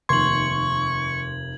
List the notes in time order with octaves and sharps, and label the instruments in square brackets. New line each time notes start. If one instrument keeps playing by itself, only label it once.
[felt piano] F1 D#2 [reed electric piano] C6 [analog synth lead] C#6 [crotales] G#6 F#7